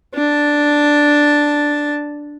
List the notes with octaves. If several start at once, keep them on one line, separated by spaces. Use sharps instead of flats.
D4 A5